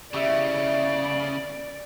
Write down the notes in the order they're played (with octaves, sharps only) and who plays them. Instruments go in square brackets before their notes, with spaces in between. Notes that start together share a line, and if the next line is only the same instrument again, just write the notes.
[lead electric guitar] C#3 [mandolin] E4 G4 [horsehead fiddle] D5